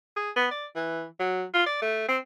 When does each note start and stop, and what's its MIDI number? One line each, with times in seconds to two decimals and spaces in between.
0.17 0.30 68
0.36 0.47 59
0.51 0.66 74
0.76 1.04 52
1.20 1.44 54
1.54 1.65 65
1.66 1.79 74
1.82 2.06 57
2.08 2.18 60